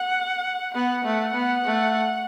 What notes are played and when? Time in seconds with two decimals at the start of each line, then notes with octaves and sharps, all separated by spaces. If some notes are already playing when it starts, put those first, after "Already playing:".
Already playing: F#5
0.74 B3 F#5
1.04 A3
1.34 B3
1.65 A3